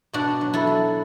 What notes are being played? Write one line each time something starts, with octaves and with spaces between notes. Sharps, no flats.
B2 D4 F#4
F#3
E4 A4
F#3